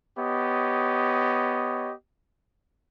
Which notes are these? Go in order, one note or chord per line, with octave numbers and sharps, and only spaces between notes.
B3 G4 C#5 D#5